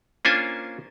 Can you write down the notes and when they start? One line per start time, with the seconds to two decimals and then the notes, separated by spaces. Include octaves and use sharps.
0.25 A#3 C#4 D4 F4 C5 G#5